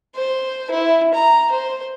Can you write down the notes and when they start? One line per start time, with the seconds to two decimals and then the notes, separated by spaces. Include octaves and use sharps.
0.15 C5
0.70 E4
1.14 A#5
1.51 C5